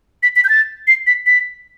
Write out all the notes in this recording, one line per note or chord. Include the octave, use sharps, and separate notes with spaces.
B6
B6
G6
A6
C7
B6
B6